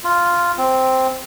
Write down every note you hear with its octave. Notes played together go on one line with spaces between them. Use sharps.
F4
C4